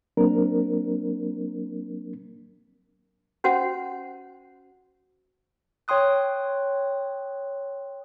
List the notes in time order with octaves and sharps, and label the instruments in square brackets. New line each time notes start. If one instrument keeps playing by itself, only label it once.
[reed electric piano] F#3 A#3 C4 D4 A#4
[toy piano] C#4 F#4 C5 F#5
[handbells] C#5 G5 C6 D#6 F#6